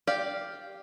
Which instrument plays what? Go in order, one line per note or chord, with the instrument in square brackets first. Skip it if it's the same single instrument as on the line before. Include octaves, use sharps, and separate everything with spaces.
[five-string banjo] G4 D5 F5